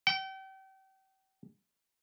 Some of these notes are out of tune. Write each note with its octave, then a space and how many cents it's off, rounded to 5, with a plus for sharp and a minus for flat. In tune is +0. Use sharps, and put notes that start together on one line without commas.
G5 -35